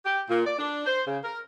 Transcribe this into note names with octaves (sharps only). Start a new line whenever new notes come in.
G4
A#2
D5
D4
C5
C#3
A#4